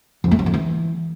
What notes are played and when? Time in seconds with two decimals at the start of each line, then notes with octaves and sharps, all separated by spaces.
0.24 F2
0.31 A3
0.39 F#3
0.46 F2
0.54 E3